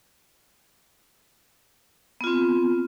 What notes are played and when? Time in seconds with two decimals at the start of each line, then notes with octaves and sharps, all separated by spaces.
2.21 B3
2.24 F4
2.27 C4